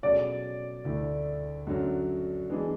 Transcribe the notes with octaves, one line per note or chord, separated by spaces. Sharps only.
B2 F#3 A3 C#4 G#4 D5
D2 D3 A3 E4
F#2 D3 F#3
E3 G#3 B3 D4 G#4